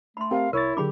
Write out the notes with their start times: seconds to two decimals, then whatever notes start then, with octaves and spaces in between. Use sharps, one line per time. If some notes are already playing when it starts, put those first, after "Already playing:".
0.17 A3 B5 C6
0.31 C4 G4 A#4 F5
0.53 C2 E4 A#4 C#5 A6
0.77 D3 F#3 D4 G4 G#4 B5 D6